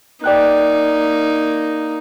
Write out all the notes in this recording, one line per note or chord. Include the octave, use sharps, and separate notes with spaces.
A#3 D#4 D5 G5 F#6